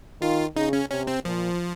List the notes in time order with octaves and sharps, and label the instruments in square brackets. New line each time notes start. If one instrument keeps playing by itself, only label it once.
[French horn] D#3 [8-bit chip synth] F4
[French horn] C#3 [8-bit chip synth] D#4
[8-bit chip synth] C#4
[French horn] C3 [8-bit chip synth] C#4
[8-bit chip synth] C4
[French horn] A#2 [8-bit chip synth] F3